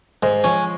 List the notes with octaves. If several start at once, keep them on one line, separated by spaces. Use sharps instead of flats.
G#2 G#3
F3 C#4